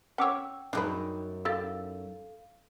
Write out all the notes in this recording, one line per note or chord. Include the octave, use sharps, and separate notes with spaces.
C#4 C#5 F#5 G5 D6 E6
F#2 D4 D#4 G#4 B4
E4 G4 A4 F5 E6 A6